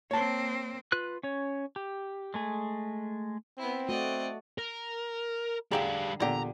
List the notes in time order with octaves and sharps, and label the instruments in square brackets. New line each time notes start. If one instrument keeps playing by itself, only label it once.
[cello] A#3 C4 [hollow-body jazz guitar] C#5 A5
[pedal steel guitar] F4 B4 F#6
C#4 C#5
G4
G#3 A3 G#4
[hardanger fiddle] B3 E4 [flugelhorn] C4
[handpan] A3 F#4 [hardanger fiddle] D5 D#5
[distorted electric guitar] A#4
[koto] D3 G4 E5 [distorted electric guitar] G3 F5 [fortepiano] G#4 A#5
[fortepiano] E2 D3 [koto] A#2 G4 [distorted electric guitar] A#5